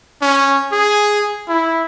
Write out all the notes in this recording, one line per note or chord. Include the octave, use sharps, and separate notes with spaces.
C#4
G#4
E4